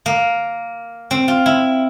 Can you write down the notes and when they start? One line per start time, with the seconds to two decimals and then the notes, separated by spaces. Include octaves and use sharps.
0.06 A#3
1.11 C4
1.28 F4
1.46 E4